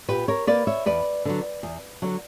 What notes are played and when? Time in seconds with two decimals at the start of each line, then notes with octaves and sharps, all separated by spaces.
0.08 A#2 G4 B4
0.28 A#4 C#5
0.47 A#3 B4 D5
0.67 C#5 E5
0.86 E2 B4 D5
1.25 D3 F#3
1.63 E2
2.02 D3 F#3